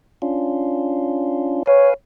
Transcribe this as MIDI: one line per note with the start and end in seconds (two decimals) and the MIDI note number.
0.22 1.63 61
0.22 1.63 62
0.22 1.63 65
1.67 1.94 71
1.67 1.90 73
1.67 1.94 77
1.67 1.94 80